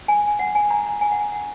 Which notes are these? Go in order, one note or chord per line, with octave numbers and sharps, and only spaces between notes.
G#5
F#5
G#5
A#5
A#5
G#5
F#5
F#5